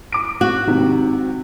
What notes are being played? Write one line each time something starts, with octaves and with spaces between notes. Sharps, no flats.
D6 D7
F#4
G#2 C3 D#3